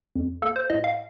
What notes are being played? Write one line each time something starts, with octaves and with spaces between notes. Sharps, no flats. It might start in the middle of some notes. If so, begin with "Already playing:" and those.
F2
A#3 A4
C5
A2 D#5
F5